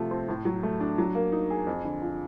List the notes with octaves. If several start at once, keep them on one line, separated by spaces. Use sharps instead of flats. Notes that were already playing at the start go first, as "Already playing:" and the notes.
Already playing: C3 F3 A3
C4
A2
F#3
A3
D4
F#3
A#3
D#4
G#4
F2
D3
F3